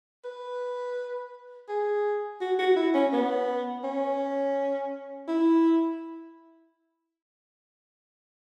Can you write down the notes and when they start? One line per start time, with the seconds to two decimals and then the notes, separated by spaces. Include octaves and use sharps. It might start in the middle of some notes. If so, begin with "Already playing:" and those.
0.25 B4
1.69 G#4
2.41 F#4
2.59 F#4
2.76 E4
2.94 C#4
3.12 B3
3.84 C#4
5.28 E4